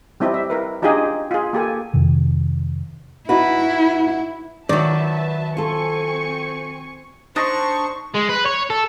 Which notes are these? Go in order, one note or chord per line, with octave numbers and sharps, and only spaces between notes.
G3 C4 E4 G4 D#5
E5
E4 A#4 B4
D4 D#4 F4 G4 G#4 D#5
F4 G#4
A#3 G4 A4 G#5
F2 C3 D#3
D#4 E4 F#4 B4
D#3 F#3 F#4 B4 D5 E5 A5
C4 F4 A4 G#5 C#6
D4 D#4 C5 C#6 D#6 A#6
G#3
B4
C#5
A4